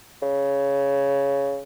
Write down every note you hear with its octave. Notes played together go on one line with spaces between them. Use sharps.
C#3